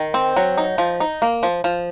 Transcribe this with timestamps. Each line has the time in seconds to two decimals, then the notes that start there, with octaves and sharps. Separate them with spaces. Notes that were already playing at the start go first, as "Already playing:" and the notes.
Already playing: D#3
0.14 C4
0.36 F#3
0.57 D#4
0.78 F3
1.00 D#4
1.22 A#3
1.43 F3
1.64 F3